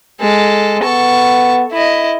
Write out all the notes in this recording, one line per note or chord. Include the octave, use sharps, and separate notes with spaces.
G#3 A4
B3 A4 C#6
E4 D#5